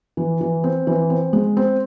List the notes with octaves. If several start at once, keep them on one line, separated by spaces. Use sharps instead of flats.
E3
E3
C4
E3
C4
G#3
C4